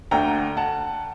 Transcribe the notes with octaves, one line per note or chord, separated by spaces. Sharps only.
D2 D3 G5 A#5
F#5 A5